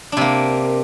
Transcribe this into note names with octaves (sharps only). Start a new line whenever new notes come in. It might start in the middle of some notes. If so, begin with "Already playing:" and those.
C3 A#3 D4